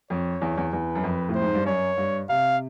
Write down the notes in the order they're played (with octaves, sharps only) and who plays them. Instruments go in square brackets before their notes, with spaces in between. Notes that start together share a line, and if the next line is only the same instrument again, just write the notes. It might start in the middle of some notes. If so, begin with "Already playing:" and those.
[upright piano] F2 [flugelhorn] C#5
[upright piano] E2
E2
[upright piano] E2 [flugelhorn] B4
[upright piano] F#2
F2
A2
[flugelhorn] C5
[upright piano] G#2
G2
[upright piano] F#2 [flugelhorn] C#5
[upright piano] G2
[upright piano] C3 [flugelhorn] F5